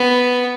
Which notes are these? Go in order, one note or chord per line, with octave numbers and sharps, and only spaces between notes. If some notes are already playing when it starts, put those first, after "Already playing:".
Already playing: B3